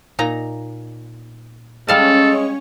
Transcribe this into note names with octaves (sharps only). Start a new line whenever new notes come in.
A#2 D#4 A#5
G3 G#3 C#4 A4 C#5 F5 A5